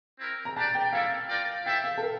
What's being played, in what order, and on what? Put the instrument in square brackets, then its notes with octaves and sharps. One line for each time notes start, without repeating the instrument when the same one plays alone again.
[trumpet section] C4 E4 A#4
[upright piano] A#5
[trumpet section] D4 G4 D5 [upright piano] A5
[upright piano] G5
[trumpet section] G3 A#3 E4 A4 D5 [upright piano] F5
[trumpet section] F4 A#4 D5 G5
[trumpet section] E4 A4 C5 E5 [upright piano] G5
[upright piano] F5
A4
A#4